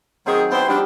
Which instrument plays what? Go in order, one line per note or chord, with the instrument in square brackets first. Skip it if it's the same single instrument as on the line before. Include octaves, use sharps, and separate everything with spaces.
[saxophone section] D#3 G#4 [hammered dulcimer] F#3 C4 D#4
[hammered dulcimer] B3 G4 [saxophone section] D4 E4 C5
[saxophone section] F3 D4 [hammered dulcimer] G3 B5